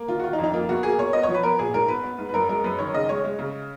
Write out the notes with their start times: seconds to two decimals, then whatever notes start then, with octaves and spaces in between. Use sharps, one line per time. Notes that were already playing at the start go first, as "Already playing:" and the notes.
Already playing: A#3
0.08 D#3 F4
0.19 F#4
0.23 D#3 F4
0.33 D#4
0.39 F2
0.44 D#4
0.53 A#3 F4
0.69 B2 F#4
0.83 A#3 G#4
0.98 B2 C#5
1.13 B3 D#5
1.23 C#5
1.28 F3
1.34 B4
1.43 B3 A#4
1.59 A#2 G#4
1.73 G#2 A#4
1.88 B3 B4
2.04 B3
2.18 G#2
2.29 B4
2.34 F#2 A#4
2.49 G#3 A#4
2.64 F#2 B4
2.79 D#3 C#5
2.94 C#3 D#5
3.09 G#3 C#5
3.24 G#3
3.39 C#3